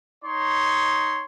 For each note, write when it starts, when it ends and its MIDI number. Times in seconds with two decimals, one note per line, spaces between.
0.24 1.25 63
0.24 1.25 73
0.24 1.25 84